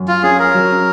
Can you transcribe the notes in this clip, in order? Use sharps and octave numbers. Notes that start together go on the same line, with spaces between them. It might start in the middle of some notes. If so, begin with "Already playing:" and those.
Already playing: F#2
F4
C#4 G#4
A#4
F#3